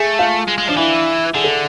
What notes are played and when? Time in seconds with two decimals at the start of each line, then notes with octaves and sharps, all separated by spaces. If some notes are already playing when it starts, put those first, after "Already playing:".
Already playing: A3 G#4
0.19 F4
0.48 G#3
0.58 G#3
0.68 F3 D4
0.76 E3 E4
1.34 D3 G#4
1.44 A4